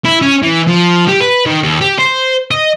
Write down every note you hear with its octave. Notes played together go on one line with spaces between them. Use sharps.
E4
C#4
E3
F3
G4
B4
D#3
D#2
G4
C5
D#5